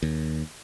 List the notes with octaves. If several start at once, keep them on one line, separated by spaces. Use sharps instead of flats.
D#2